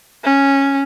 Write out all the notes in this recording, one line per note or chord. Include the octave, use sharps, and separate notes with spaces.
C#4